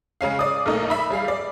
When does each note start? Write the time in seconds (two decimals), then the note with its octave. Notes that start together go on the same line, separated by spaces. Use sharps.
0.21 C#3 G#3 C#4 F5
0.39 D5 D#6
0.66 B1 A3 A#3 D#4
0.90 E5 B5
1.10 G3 G#4 F5
1.28 D5